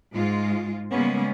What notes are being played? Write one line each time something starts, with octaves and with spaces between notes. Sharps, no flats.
G#2 G#3 F4
C#3 G3 G#3 A#3 B3 C#4